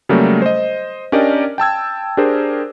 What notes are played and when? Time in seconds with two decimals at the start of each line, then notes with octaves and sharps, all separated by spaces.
0.09 C#3 F#3 G3 A3 A#3
0.42 C5 D#5
1.12 C#4 D4 G4 A#4 D5 D#5
1.58 G5 A5 E6 G#6
2.17 D4 G4 G#4 A#4 C5